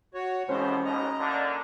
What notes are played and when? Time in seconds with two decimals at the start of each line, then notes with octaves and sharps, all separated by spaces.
0.14 F#4 C#5
0.49 C2 F2 B2 E3 G#3 C#4 C5
0.85 A1 D#2 B2 D#5 A#5
1.20 A#2 D3